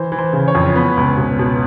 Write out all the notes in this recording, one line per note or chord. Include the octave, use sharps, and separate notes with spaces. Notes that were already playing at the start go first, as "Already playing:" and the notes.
Already playing: E3 C5
E3
C5
C#3
C#5
F2
B3
C#2
B2
B2